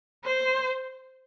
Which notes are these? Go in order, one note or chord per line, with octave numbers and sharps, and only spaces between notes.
C5